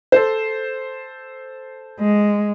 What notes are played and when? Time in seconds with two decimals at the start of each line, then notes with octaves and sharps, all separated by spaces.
0.12 A4 C5
2.00 G#3